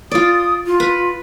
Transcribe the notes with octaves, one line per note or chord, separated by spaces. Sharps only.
F4 D5 D#6
F4
B4